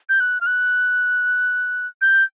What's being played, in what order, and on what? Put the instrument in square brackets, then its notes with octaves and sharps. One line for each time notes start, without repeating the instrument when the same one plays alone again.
[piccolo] G6
F#6
F6
F#6
G6